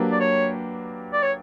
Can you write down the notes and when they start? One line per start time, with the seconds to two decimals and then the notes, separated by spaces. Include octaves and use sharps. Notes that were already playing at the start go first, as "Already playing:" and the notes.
Already playing: F#3 A#3 D4 G4 B4
0.11 D5
0.20 C#5
1.13 D5
1.22 C#5